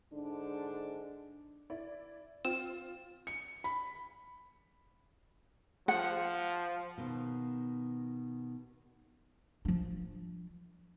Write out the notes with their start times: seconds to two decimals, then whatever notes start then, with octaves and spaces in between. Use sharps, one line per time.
0.12 G#2 D3 D4
1.70 E4 D5
2.45 C4 F4 E7
3.27 C#7
3.64 B5
5.88 F3 F#5
6.98 B2 D#3
9.65 F3 D4